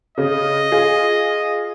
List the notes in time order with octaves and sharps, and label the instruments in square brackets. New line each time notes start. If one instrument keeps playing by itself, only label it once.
[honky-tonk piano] C#3 [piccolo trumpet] D#5
[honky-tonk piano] F4 G#4